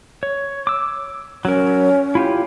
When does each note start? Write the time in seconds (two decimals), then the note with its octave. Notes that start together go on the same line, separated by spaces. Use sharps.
0.23 C#5
0.67 D6 E6
1.45 F#3 C#4 A#4
2.15 E4 F4 G4